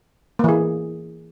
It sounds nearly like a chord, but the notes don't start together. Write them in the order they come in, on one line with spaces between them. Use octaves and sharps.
A#3 E3 G#4